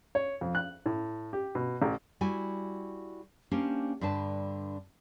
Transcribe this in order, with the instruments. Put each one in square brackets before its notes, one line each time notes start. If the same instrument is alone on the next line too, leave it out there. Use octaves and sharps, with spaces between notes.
[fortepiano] C#5
F2
F#6
A2
G4
B2
A1
[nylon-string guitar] G3 E4 F#4 G#5
A#3 C#4 D4 G4 C5
G2 D3 D4 B4 A5